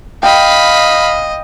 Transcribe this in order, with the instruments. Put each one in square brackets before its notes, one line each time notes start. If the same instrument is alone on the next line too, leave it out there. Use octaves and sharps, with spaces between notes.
[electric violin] D#5 [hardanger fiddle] F5 B5 [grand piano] G5